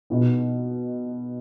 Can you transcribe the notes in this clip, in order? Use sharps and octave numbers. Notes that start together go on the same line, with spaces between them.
B2 B3 D#4